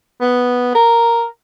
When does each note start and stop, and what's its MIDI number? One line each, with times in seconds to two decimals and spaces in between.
0.21 0.74 59
0.75 1.24 70